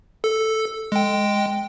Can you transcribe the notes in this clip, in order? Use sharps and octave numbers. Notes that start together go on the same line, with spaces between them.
A4
G#3 G5